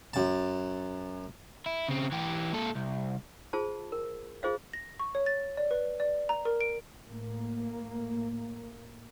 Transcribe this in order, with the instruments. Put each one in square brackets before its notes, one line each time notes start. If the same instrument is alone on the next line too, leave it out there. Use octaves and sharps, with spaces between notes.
[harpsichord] F#2 A5
[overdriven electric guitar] E4
C#3 C4
E3 G4
A#2 A4
C2
[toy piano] F4 G#4 C5 A5
A#4
F4 G#4 C5 D#5 F5
[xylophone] A#6
C#6
C#5
A6
D5
B4
D5
A#5
A#4
D7
[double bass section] A2 A#3